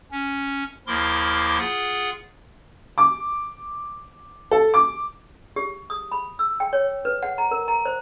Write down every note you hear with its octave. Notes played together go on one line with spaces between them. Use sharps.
C#4
D#2 F3 E4 A#4 C6 D6
F4 G#4 F#5
D6
A4
D6
G4
D#6
B5
E6
G5
C#5
B4
F#5
A#5
A#4
A#5
C5